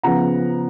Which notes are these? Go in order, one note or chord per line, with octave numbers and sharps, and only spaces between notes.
C#3 F3 B3 F#5 A#5